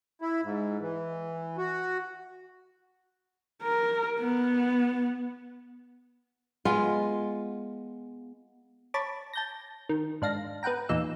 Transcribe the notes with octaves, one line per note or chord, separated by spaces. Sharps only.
E4
G#2
E3
F#4
A#4
B3
G#3 B3 F4
C#5 A5 B5 D6
A5 G6 A#6
D#3
G#2 D4 F5 A#6
B3 B4 F#5 G5 A#5
E2 A#2 D#4 E6